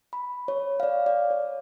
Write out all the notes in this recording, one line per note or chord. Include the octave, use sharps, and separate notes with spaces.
B5
C#5
F5
D5
D5
C#5